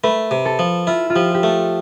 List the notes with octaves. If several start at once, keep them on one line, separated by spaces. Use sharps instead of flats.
A3 B4
C3
A4
F3
E4 F4
F4
F3 G4
G4
A3 A4